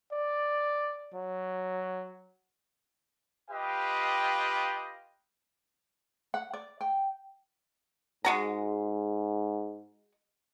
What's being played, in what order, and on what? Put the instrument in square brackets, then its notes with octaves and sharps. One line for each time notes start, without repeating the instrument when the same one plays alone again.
[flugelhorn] D5
F#3
[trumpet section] F4 G4 B4 D#5 F5 G5
[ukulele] F#5
D5
G5
[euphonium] G#2 [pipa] G#3 F#4 A#5